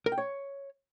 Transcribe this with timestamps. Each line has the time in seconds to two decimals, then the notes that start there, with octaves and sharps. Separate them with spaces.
0.06 A#4
0.12 G5
0.18 C#5